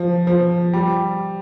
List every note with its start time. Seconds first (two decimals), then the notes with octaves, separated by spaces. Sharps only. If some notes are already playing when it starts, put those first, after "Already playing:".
Already playing: F3
0.27 F3
0.73 G3